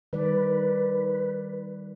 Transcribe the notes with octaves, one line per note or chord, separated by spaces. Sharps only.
D#3 G3 B4 D5